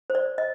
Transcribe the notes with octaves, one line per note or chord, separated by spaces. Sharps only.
C5
D5
D#5